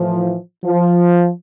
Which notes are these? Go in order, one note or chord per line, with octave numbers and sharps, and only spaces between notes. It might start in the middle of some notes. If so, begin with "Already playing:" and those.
Already playing: A2 E3 F3
F3